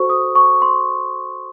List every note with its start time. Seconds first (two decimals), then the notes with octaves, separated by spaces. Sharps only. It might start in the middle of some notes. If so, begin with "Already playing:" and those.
Already playing: F#4 A4 C5 C#6
0.10 D#6
0.35 C#6
0.62 C6